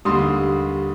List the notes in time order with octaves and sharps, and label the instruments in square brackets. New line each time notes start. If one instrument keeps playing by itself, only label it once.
[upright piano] D#2 D3 G3 C6 D#6